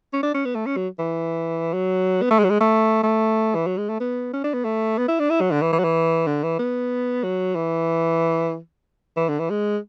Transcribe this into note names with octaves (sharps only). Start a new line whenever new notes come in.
C#4
D4
C#4
B3
A3
C#4
F#3
E3
F#3
B3
A3
G#3
F#3
G#3
A3
A3
E3
F#3
G#3
A3
B3
C#4
D4
B3
A3
B3
E4
D4
E4
F#3
D3
E3
E3
F#3
E3
D3
E3
B3
F#3
E3
E3
D3
E3
G#3